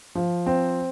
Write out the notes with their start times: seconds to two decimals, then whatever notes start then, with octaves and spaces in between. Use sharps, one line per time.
0.15 F3
0.46 C4